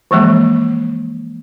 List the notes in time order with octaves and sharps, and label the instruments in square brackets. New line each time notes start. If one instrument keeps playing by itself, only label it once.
[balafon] E3 F3 G#3 A#3